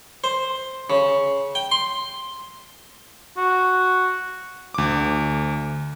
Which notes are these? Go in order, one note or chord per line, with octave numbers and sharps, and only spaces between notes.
C5
C#3
G5
C6
F#4
D2 D6